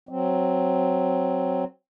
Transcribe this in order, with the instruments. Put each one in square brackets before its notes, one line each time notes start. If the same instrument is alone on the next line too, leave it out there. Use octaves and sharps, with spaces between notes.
[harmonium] F#3 C4